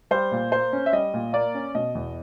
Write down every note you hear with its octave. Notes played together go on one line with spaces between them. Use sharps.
G3 C5
A#2
A#3 C5
C#4
E5
G3 D#5
A#2
A#3 D5
C#4
B2 D#5
E2